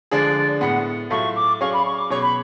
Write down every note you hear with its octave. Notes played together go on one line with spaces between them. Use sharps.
D3 F3 G#3 D4 G#4 D5
A2 G#3 B3 F#5
A2 F#3 A3 F4 A4 C#6
D6
F#3 C#4 G#4 D5 F5 C#6
B5
C#6
D6
B2 F#3 C#4 G#4 C#5 C#6
B5